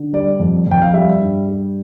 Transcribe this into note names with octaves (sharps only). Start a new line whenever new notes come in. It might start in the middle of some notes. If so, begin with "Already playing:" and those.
Already playing: D3
G3 D5
F2
F2 G5
F5
G3 E5
G2
G3